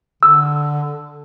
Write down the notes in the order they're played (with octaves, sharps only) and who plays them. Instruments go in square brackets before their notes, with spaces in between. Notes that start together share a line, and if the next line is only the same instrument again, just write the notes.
[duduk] D3 [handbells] E6